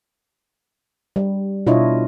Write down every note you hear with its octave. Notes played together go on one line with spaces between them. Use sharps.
G3
B2 D4 E4 F4 C#5 D#5